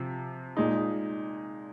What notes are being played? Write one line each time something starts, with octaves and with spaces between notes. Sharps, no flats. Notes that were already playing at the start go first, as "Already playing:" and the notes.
Already playing: C3 F3
A#2 G#3 D#4